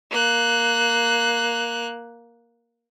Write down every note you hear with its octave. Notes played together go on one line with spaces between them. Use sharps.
A#3 F#6